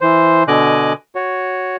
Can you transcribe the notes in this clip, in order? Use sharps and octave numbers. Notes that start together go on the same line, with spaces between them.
E3 C5
B2 D3 D#5 G#5 D6 F#6
F#4 C#5